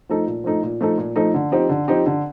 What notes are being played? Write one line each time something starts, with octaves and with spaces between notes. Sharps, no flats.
F3 A3 D#4 A4
A#2
F3 A3 D#4 A4
A#2
F3 A3 D#4 A4
A#2
F3 A3 D#4 A4
D3
F3 C4 D#4 G4
D3
F3 C4 D#4 G4
D3